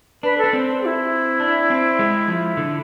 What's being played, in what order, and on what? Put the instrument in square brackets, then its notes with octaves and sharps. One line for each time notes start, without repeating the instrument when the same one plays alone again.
[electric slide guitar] D4 [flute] B4
[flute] A4
[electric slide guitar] D4
C4
[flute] G#4
E4
[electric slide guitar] D4
C4
G#3
F3
D3